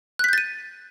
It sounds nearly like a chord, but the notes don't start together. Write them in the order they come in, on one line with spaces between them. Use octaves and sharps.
F#6 B6 G6 A6 D#7